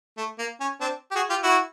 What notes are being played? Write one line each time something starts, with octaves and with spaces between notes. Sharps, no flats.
A3
A#3
C#4
C4 D4
G4
F#4 G#4
F4 G4
E4 F#4